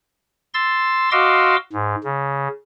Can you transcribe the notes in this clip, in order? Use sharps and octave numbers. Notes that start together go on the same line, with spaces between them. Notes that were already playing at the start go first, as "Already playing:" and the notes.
C6 E6 A6
F#4 D#5 F5 C6 D6 E6
G#2
C#3